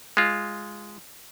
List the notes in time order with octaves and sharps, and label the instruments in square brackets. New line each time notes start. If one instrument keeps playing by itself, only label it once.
[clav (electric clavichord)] G#3 F4